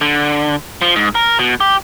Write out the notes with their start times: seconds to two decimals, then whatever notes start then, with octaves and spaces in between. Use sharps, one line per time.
0.01 D3
0.82 F3
0.96 G#2
1.15 A#4
1.39 B2
1.60 G4